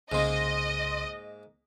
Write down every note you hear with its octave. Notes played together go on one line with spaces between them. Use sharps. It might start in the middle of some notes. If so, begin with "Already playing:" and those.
C2 G#2 C#3 A#3 D#5 C6